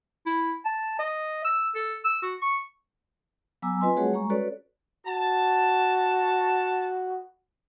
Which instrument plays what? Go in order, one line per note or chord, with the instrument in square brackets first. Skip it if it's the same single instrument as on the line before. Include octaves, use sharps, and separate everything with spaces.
[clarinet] E4
A5
D#5
E6
A4
E6
F#4
C#6
[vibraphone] F#3 B3 G#5 A#5 D6 E6
C4 F4 B4 D#5 G#5 C6
G3 A3 F#4 G#4 C#5 F#5
G3 G#3 A#5 C#6
C#4 F#4 A4 B4 C#5 D5
[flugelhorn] F#4 [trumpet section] A5